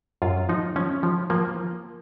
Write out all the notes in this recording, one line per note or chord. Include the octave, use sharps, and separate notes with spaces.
F#2 F4
F3 D#4
F3 C#4
F3
F3 A#3